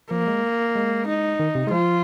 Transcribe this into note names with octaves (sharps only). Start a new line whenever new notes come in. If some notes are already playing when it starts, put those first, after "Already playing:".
F3 A#3
G#3
G#3
D#4
D#3
C3
G#3
F3 F4